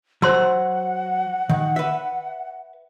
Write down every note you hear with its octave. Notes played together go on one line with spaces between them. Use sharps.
F#3 C5 F#5 C6 E6
D#3
B4 E5